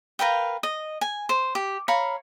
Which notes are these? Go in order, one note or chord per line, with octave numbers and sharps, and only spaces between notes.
A#4 B4 F5 G5
D#5
G#5
C5
G4
C#5 F5 A#5 B5